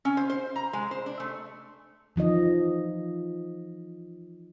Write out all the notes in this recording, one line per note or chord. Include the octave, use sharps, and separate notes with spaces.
C#4
C5
C5
A#5
G#3
C5
D4
A3
E3 F3 D#4 D#5